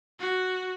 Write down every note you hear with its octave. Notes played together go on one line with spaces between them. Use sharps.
F#4